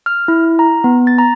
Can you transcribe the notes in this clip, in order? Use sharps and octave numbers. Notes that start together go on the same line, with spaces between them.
F6
E4
A#5
B3
A6
A#5